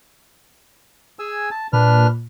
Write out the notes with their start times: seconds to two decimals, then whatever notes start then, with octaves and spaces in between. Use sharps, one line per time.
1.19 G#4 G#5 E6
1.51 A5
1.73 A#2 D4 B4 F6